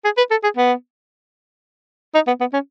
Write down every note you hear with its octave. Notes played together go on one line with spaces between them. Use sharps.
G#4
B4
A4
G#4
B3
D#4
B3
B3
C#4